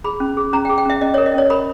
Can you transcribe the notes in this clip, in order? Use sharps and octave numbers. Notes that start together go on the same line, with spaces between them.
G#4 B5
C#4
G#4
C#4 A#5
G5
G#4
G5
C#4 E5
C#4 D#5
C#5
A#4
D#5
C#4 C#5
A#4 B5